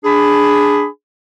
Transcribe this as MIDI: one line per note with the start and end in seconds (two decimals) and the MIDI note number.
0.05 0.85 62
0.05 0.85 68
0.05 0.85 83